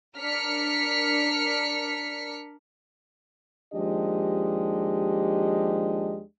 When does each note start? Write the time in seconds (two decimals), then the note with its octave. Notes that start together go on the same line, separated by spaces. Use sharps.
0.17 D4 A#4 F6 B6 C#7
3.74 D#2 F3 G#3 D4 G4 D#5